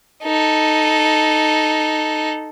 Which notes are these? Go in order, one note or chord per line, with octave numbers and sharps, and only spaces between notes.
D#4 A4